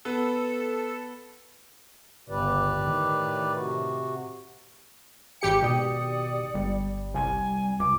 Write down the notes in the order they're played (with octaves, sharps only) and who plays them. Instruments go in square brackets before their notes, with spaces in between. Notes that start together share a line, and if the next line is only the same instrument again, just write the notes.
[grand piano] B3 [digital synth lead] A4
[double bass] G1 C#2 [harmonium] G4 B4 D5
[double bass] A2 D#3
[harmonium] C3 F#4
[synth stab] G#1 G4 C#7 [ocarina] G5
[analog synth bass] B2 [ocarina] D5 [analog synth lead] D#6
[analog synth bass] G1 [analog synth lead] G3
[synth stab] C2 [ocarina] G#5
[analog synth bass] C#2 [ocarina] D6